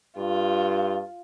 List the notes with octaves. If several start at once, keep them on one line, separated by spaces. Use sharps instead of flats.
G2 F4